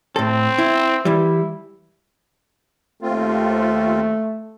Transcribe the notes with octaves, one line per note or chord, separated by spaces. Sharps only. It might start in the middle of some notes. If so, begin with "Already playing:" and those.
A2 C4 A4
E4
E3 G3 E4
D#2 A3 C4 F4